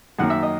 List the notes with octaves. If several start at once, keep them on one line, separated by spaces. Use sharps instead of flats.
F#2 D#3 F#3 A#3 F#5
E5
D#5